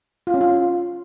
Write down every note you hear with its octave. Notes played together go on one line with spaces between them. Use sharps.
F4
C#4
F4